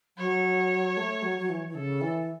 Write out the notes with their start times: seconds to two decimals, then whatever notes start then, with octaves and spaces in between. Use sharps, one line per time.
0.18 F#3 C#5
0.97 A3
1.22 F#3
1.38 F#3
1.49 E3
1.68 E3
1.75 C#3 A4
2.01 E3